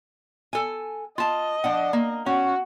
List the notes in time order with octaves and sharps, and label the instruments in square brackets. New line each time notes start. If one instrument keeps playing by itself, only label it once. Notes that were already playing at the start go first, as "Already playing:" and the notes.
[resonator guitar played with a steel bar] A4 G#5
[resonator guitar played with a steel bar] F4 A5 [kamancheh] D#5
[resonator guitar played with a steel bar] F3 D4 F#5
A#3
[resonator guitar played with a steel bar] C#4 [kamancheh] F#4